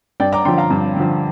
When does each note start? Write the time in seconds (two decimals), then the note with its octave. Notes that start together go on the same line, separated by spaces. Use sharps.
0.20 G2 D5 G5
0.33 A#5 D6
0.45 D3 F3 G5 C6
0.58 F5 A#5
0.70 G2
0.97 D3 F3